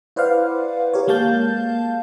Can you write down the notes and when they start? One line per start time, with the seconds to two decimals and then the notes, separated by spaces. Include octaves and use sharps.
0.16 E4 B4 C5 D5 F5 F#5
0.93 G4 A#4 C#5
1.07 G#3 A#3 F5 A5 G6